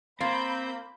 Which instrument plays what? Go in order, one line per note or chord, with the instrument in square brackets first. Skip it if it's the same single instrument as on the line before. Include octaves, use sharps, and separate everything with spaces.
[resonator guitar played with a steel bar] A#3 [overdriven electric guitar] C4 [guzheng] F4 [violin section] B5 G6